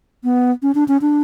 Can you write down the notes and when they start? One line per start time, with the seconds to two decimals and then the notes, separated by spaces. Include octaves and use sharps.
0.24 B3
0.62 C#4
0.75 D4
0.88 C#4
1.01 D4